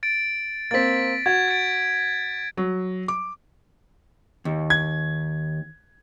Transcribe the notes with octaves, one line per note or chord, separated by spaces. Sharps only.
A6 D7
A#3 C4 A6 B6
F#4 G#6
A6 D7
F#3
D6
D#2
G#6